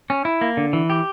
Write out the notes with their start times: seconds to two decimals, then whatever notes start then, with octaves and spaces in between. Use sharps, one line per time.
0.10 C#4
0.25 E4
0.41 A#3
0.57 D3
0.73 E3
0.90 G4